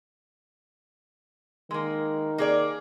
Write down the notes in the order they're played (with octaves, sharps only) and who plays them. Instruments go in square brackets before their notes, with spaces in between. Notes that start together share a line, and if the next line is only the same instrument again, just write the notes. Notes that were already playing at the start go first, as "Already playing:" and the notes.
[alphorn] D#3 [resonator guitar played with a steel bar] G#3 A#3
[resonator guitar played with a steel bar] A#3 G#4 D5